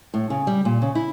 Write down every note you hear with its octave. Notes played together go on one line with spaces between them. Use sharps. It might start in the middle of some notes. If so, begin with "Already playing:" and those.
A2
C#3
G3
A#2
C#3
E4